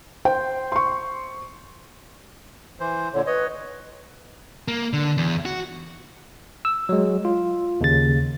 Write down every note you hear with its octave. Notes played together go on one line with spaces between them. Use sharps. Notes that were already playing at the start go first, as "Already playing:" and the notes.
C5 G5
C6 C#6
E3 C5
A#2 D3 C#5
B4 C#5 D#5
A#3
D3
E2
F#4
E6
F#3 G#3
F4
D#2 C#3 A6